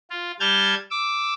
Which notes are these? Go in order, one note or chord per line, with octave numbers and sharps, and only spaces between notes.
F4
G3 A5 F6 G6 G#6
D6 E6